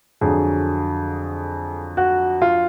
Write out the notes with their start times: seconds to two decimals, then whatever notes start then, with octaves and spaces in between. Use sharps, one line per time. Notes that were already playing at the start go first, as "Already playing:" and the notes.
0.21 F2 D3 F#3 G#4
1.97 F#4
2.42 F4